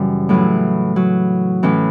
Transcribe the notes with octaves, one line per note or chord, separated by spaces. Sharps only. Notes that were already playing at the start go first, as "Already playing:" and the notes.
Already playing: F#2 C#3 E3 G3
A2 E3 F#3
F#3
A2 E3 C#4